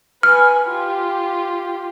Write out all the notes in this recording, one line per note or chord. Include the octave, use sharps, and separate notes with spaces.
B4 G#5 F6
F4 G4